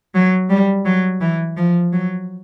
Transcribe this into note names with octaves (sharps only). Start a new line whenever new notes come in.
F#3
G3
F#3
E3
F3
F#3